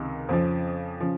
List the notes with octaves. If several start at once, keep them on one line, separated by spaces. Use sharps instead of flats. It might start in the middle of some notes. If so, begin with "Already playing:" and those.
Already playing: C#2 C3 D#3
F2 C#3 F3 C4
C#3 F3